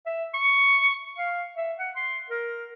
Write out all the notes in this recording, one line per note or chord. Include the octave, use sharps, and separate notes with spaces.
E5
C#6
F5
E5
F#5
C6
A#4